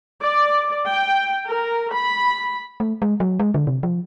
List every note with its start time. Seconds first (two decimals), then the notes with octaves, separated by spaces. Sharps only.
0.21 D5
0.88 G5
1.49 A#4
1.92 B5
2.80 A3
3.02 G#3
3.20 F#3
3.40 G#3
3.54 D3
3.67 C3
3.83 F3